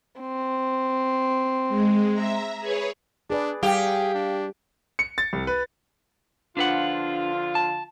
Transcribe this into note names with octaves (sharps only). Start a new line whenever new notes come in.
C4
G#3
E5 A#5
G#4 B4 C#5
D4 G#4 B4 D5
G3 G4 G#4 F5 G5
D4
C#7
A6
C2
B4
D3 F3 D4 F4 B4 F#5
A5